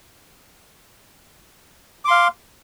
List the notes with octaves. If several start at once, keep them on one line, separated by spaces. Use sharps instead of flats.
F5 C6 D6